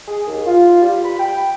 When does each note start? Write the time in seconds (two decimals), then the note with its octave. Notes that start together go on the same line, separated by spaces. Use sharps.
0.08 G#4
0.27 D#2
0.46 F4
0.81 G3
1.05 B5
1.20 G5